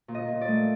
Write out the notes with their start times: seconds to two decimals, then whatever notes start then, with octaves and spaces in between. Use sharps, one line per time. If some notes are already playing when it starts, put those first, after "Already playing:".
0.08 A#2
0.15 D#5
0.28 A#2
0.41 D5
0.48 A3